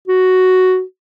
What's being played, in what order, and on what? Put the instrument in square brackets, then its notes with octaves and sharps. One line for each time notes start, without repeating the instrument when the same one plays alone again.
[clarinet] F#4